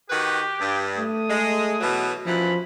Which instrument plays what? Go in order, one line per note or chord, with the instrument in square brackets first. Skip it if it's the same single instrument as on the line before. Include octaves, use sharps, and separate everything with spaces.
[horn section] D#3 F#4 B4 [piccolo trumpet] G4
[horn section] G2
[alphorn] A3 [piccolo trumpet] D#6
[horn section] G#3
B2 E3 F#3
[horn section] F#2 B2 E3 [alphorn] F3 [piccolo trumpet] B5